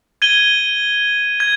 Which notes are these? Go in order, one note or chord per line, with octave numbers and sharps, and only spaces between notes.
G#6 D#7 G7
G#6